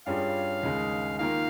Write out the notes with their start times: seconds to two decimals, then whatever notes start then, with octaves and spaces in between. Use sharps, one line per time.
0.06 G2 G3 C#4 F4 G#4 F5
0.63 D#2 C#3 G#3 D#4
1.19 D#3 A#3 F4 A#4 F5